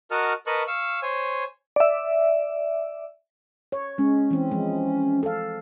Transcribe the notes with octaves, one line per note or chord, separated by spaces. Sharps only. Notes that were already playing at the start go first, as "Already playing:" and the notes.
F#4 A#4 D#5 F#5 A5 F6
A#4 B4 D#5 A5 C#6 F#6
F5 C#6 E6
C5 C#5 G#5
D5 E5
C#5
G#3 C#4
E3 C4
F3 G#3
A4 F5